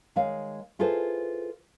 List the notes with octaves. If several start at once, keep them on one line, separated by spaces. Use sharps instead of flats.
D#3 G#3 C#5 F5
E4 F4 G#4 A4 B4 C5